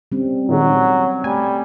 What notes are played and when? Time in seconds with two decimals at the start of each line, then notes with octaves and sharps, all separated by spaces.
0.12 G3 C4 C#4
0.49 A#2 D#3 F#3 G#3
1.24 G3 A3 G#5